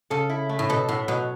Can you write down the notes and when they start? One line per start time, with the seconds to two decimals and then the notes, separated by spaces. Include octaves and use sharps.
0.10 C#3 A4
0.30 E4
0.49 A3
0.59 A2
0.69 B2 A4
0.89 A2 B3
1.08 B2 F#3